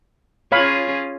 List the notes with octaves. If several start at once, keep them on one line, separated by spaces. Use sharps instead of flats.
C#4 F4 G#4 C#5 F5 B5